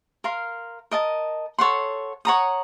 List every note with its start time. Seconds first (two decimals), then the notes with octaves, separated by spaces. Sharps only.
0.24 A#4 F5 C6
0.91 A#4 D#5 A5
1.59 A4 C#5 F#5 C6
2.25 C#5 F#5 A#5 D#6